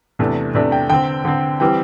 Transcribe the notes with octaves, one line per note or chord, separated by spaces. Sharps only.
E2 C3 A3 D4
E2 C3 A3 D4 D5
G5
D3 C4 G5
D3 C4
E3 G3 C4 G5